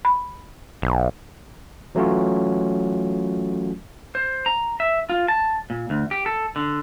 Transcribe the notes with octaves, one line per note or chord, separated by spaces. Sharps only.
B5
B1
E3 F#3 A3 C#4 F4 F#4
C5
A#5
E5
F4
A5
A#2
D2
G4
A4
D3